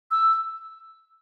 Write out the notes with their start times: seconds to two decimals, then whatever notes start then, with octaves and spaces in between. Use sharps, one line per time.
0.11 E6